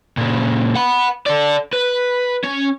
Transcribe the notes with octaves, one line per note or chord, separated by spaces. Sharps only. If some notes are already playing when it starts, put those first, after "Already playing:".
A#2 C#3
F#5 B5
A4 D5
B4
C#4